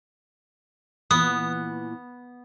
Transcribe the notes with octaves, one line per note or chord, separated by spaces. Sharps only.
A#2 E3 B3 D#6